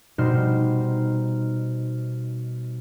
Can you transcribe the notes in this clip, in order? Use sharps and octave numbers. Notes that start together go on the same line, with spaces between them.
B2 G3 D#4 C5 F6 C7